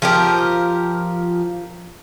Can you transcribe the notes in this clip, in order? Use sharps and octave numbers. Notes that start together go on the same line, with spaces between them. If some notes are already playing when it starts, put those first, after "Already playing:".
F3 G4 A#4